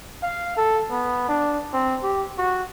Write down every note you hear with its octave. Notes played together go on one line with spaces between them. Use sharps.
F5
A4
B3
D4
C4
G4
F#4